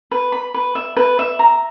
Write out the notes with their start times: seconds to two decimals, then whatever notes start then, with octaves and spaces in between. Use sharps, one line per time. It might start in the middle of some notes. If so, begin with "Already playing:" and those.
0.11 B4
0.32 B5
0.54 B4
0.75 E5
0.97 B4
1.19 E5
1.39 A#5